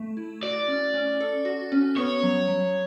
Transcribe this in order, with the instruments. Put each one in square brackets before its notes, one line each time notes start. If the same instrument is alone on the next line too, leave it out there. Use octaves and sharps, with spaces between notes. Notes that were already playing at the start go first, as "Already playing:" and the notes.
Already playing: [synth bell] A3
E4
[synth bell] F#4 [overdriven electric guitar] D5
[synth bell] C#4
C#4
A4
F#4
C#4
[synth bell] B3 [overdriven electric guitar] C#5
[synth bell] F#3
F#3